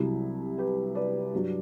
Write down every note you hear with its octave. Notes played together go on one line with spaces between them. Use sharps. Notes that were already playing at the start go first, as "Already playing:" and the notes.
Already playing: C2 C3 F#3 E4
G4 B4
B4 D5
G2 F#3